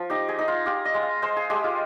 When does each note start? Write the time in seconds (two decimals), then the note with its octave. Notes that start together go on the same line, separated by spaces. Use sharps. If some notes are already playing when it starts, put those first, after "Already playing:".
Already playing: F3
0.10 D#4 G4
0.28 G#4
0.39 D#4
0.48 F4
0.66 F4 G4
0.85 D#5
0.94 G#3
1.03 F5
1.22 G#3 C5
1.37 G#4
1.50 G#3 G4
1.64 F4